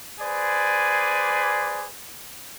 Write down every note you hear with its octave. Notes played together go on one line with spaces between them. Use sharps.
G#4 B4 C5 D5 G#5